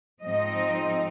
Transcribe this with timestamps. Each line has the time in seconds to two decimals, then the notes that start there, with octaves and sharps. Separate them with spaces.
0.23 G#2 F3 C4 D#4 D#5